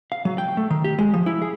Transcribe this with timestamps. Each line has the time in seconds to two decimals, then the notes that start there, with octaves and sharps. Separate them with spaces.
0.12 F5
0.25 F#3
0.38 G5
0.57 A3
0.70 D#3
0.84 G4
0.99 G#3
1.14 F3
1.26 E4
1.42 G#4